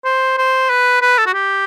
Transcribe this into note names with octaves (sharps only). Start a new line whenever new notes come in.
C5
C5
B4
B4
A4
F#4
G4